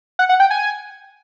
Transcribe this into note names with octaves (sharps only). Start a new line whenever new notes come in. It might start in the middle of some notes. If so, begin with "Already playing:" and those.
F#5
F#5
G5
G#5